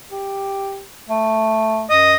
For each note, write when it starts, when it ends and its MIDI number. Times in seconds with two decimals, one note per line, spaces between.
0.11 0.82 67
1.09 1.85 57
1.90 2.16 42
1.90 2.16 75